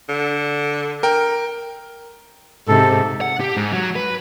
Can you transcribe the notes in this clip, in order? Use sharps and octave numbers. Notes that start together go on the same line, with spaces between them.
D3
A#4 G5
G#2 C3 A4
F#5
G4
G#2
F#3
B4